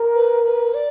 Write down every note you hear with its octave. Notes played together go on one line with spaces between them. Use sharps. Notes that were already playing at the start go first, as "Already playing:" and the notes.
Already playing: A#4
B4
B4
D5